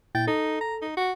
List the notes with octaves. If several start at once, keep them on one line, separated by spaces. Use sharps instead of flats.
A#2 E4 G5 A6
D#4 A4
A#5
D#4
F#4